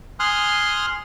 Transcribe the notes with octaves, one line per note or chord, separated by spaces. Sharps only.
G#5 C6 D#6 F6 F#6